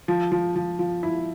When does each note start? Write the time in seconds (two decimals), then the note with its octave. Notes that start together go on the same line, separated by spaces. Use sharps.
0.08 F3
0.32 F3
0.56 F3
0.79 F3
1.03 E4